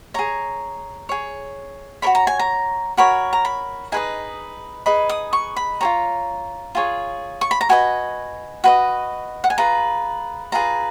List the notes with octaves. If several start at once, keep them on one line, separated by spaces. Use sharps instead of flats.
G#4 C#5 A#5
G#4 C#5
F#4 A#4 C#5 B5
A#5
G#5
A#5
F#4 A#4 C#5 B5
A#5
B5
D#4 G#4 B4 D#5 G#5
D#4 G#4 B4 D#5 B5
D#6
C#6
B5
F4 G#4 C#5 A#5
F4 G#4 C#5
C#6
B5
A#5
F#4 B4 D#5 G#5
F#4 B4 D#5
F#5
G#5
F4 G#4 B4 A#5
F4 G#4 B4 A#5